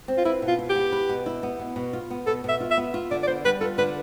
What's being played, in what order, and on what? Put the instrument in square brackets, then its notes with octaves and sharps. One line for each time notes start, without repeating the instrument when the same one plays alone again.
[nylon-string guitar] C4
[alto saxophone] F4
[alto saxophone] E4 [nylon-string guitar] B4
[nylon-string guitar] B2
[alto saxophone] F4
[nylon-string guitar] E4
[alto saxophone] G4
[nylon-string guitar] B3
B4
B2
E4
B3
B2
B2
F4
B3
[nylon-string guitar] B2 [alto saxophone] A4
[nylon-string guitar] B2 [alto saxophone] E5
[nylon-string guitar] F4
[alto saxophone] E5
[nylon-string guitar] B3
F4
[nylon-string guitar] D3 [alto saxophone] D5
[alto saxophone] D5
[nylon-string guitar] B3 [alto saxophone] C5
[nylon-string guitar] G3 [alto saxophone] B4
[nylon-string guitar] F4 [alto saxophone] A4
[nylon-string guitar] D3 [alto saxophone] B4